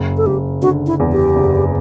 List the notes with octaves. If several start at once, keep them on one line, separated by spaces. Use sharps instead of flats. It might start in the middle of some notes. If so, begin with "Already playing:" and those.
Already playing: F#1
A4
F#1 G4
D3 F#4
E4
E2
G4
F#1